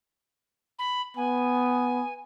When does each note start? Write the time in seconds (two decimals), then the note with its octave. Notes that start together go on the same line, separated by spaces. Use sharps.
0.79 B5
1.17 B3 G#5